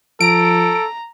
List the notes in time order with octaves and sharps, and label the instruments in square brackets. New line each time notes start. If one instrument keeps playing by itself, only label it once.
[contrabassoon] F3 [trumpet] A4 [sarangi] A#5 [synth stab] D7